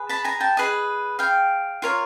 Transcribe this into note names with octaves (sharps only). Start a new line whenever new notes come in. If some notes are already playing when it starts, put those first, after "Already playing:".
Already playing: G#4 B4
A5 B5
G#5 A#5
G5 A5
G#4 B4 D#5
F5 G5
F4 A#4 C#5